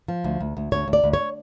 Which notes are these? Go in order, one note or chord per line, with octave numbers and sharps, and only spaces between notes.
F3
D2
D2
D2
D2 C#5
D2
D5
D2
C#5